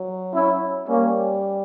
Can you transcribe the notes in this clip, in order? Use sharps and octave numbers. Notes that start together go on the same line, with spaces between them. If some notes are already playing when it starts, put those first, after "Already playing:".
Already playing: F#3
C#4 E4
G3 A#3 C#4